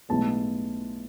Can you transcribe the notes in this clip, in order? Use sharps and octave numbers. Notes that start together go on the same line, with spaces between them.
B1 A2 G#3 B3 A5